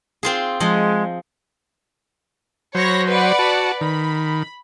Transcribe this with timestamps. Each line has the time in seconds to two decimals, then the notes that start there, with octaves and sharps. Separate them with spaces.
0.23 C4 F4 G#4
0.60 F3 G#3 D#5 G#5
2.75 F#3 C5 C#5 B5 A#6
3.08 B4 D5 F#5
3.39 F#4 A5
3.81 D#3 B5